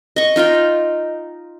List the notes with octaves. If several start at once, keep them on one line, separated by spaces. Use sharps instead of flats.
D#5 C#6
D#4 F4 F5 G5